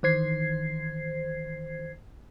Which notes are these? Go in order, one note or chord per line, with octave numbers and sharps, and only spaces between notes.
D#3 E3 C5 G#6 C7